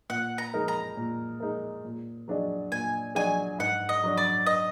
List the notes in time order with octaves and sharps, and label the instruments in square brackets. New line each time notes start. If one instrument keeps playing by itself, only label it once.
[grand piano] A#2 [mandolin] F#5
[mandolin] A#5
[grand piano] G#3 D#4 A#4
[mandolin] A#5
[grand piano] A#2
G#3 D#4 A#4
A#2
F#3 D4 G#4 D#5
[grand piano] A#2 [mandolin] G#5
[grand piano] F#3 D4 G#4 D#5 [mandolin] G#5
[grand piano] G#2 [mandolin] F#5
[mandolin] D#5
[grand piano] F#3 D4
[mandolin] D5
D#5